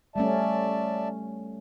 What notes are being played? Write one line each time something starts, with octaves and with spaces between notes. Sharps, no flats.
G3 A3 C#4 D5 E5 A5